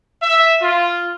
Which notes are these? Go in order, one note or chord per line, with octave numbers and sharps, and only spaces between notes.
E5
F4